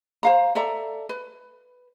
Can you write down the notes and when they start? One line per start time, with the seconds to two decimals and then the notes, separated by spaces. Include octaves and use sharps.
0.23 C5 F5 A#5
0.55 A4 D5 E5 A#5
1.09 B4